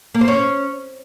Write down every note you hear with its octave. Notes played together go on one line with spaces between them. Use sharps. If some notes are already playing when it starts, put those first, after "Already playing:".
A#3
C5
C#4